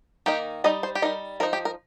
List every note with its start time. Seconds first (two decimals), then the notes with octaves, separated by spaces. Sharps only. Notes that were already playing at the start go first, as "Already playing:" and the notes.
0.26 D#3 A#3 D#4 G4
0.64 G3 D#4 D#5
0.83 C5
0.95 G4
1.02 G3 D#4 A#4
1.40 F3 A#4
1.43 D#4
1.53 G4
1.65 A#4